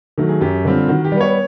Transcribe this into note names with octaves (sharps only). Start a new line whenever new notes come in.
D#3 F#3 A3
G#4
F#2 G4
D3 G3 C4 F4
D#3 F#4
G4
G3
B3 C#5